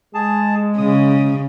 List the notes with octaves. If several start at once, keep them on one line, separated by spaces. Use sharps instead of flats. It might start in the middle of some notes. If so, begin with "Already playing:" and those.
G#3 G#4 A5
C#3 D#6